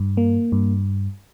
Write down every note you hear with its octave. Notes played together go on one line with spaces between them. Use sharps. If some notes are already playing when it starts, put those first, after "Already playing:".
Already playing: G2
A#3
G2